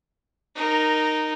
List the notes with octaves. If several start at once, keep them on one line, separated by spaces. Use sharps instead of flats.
D#4 A#4